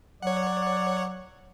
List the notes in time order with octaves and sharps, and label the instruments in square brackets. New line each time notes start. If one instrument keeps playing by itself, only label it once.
[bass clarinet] F#3 [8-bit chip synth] C#5 F#5 [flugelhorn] D5